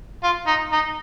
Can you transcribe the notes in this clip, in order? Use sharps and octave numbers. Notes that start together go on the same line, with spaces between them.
F4
D#4
D#4